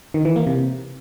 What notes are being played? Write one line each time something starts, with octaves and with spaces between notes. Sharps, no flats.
D#3
E3
A#3
C3